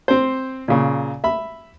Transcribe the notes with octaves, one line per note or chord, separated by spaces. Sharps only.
C4 C5
A#2 C#3
E5 B5